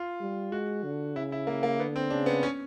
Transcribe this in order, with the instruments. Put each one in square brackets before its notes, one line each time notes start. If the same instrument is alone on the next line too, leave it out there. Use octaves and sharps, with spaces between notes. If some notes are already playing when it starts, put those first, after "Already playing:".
Already playing: [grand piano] F4
[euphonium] G3
[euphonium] G#3 [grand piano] F#4
[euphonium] D3
[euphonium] C#3 [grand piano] E4
[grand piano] E4
A#3
A#3
[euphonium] D3 [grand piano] B3
[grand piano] C4
[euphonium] C#3 [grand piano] D4
[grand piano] B3
C#4